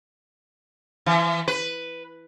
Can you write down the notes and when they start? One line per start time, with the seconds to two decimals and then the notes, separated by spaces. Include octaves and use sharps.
1.06 E3
1.48 B4